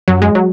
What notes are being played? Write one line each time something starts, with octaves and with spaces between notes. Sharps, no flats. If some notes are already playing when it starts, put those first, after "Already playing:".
F#2 F#3
G#3
F#3